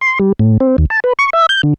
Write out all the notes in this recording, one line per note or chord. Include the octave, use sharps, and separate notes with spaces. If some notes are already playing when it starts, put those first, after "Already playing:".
C6
G3
A2
C4
D#2
A5
B4
C#6
E5
G6
D3